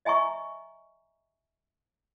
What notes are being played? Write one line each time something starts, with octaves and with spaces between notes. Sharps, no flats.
D#5 E5 G#5 A#5 C#6